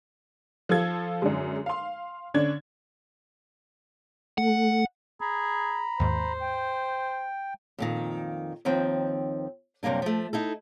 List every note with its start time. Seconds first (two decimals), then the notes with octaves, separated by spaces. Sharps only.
0.69 F3 F4 A4 G#6
1.22 F#2 D3 G#3
1.66 F5 C6
2.34 D3 C#4 D4 G#6
4.38 A3 F#5
5.21 G#4 A#5 B5
6.00 D#2 G#2 C5
6.41 G5
7.79 F2 A#2 D#3
8.65 D#2 D#3 F3 C4
9.83 F#2 C3 G3 A#3 D4
10.02 F3 A3
10.33 D#4 E4 A4